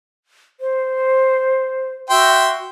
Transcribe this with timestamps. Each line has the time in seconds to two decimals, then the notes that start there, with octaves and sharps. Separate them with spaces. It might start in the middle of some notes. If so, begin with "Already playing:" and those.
0.60 C5
2.10 F#4 E5 G5 C6